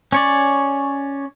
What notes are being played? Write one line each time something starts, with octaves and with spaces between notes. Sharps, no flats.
C#4 C#5 D5